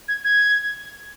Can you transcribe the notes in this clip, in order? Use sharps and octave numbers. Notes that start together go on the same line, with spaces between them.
G#6
G#6